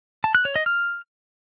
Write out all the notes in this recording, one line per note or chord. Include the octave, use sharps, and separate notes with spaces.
A5
F#6
C#5
D#5
F6